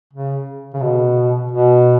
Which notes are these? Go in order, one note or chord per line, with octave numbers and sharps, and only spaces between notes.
C#3
C#3
B2
B2